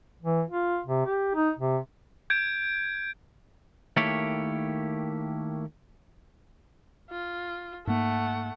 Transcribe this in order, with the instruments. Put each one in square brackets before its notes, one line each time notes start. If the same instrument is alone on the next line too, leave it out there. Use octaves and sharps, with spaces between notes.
[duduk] E3
F4
C3
G4
D#4
C3
[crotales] G6 G#6 D7
[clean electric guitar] D#3 A3 A#3 E4 G4 C#5
[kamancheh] F4
[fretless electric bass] G#2 A#3 [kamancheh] A3 F#5